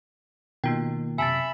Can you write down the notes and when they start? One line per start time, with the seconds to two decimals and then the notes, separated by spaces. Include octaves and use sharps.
0.64 B2 D#3 A#3 F4 G5
1.18 F#2 C3 E5 G#5 A5 B5 E6 A6